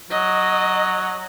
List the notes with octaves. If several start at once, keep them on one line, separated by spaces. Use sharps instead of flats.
F#3 D#5